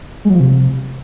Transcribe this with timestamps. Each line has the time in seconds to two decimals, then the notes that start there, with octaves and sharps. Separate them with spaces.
0.25 G#3
0.30 F#3
0.35 F3
0.40 C3